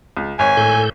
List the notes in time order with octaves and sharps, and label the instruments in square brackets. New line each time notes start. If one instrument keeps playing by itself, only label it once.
[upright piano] C#2
[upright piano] G#1 C#5 [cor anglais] G#5
[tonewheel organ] A2 A4 G6